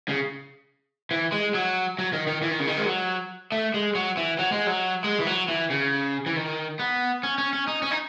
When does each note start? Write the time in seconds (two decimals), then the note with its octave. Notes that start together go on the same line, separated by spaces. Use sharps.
0.09 C#3
1.11 E3
1.32 G#3
1.55 F#3
1.99 F#3
2.13 D#3
2.27 D#3
2.42 E3
2.51 D#3
2.60 C#3
2.67 D#3
2.77 G#3
2.85 F#3
3.52 A3
3.74 G#3
3.95 F#3
4.17 E3
4.39 F#3
4.52 G#3
4.67 F#3
5.04 G#3
5.20 E3
5.27 F#3
5.48 E3
5.70 C#3
6.26 E3
6.36 D#3
6.79 B3
7.23 C#4
7.38 C#4
7.53 C#4
7.68 D#4
7.82 C#4
7.91 D#4